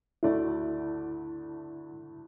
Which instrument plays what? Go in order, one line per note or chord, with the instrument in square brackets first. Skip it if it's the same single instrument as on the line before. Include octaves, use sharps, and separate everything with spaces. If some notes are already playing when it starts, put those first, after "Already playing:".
[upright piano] D2 D3 A3 F#4 D5 [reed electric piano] E4